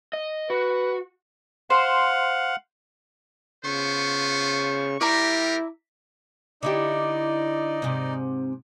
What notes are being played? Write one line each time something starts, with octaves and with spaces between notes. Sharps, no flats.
D#5
F#4 B4
C5 F5 F#5
C#3 B3 F4 C5 C#6
G3 E4 G4 A#4 D5 E5 A#5
D3 D#4 E4 G4 D5 D#5
G#2 C3